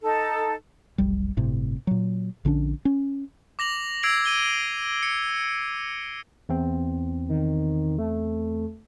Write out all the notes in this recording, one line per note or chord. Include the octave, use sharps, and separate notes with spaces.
D#4 A4
F1 B1 G3
G1 A2 C3
A#2 F#3
A#1 D3 C#4 D4
C#4
D6 A#6 F7 F#7
E6 G#6 C7 D7 F7 F#7
D#7 G7
C#7
E2 C4
D#3
A3